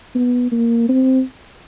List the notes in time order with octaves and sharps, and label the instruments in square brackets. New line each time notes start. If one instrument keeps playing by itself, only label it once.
[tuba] B3
A#3
C4